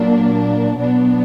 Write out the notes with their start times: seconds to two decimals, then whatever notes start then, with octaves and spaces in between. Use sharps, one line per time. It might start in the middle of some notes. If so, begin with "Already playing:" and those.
Already playing: A#2 F#3 A#3 D4
0.78 B2 F#3 B3 D4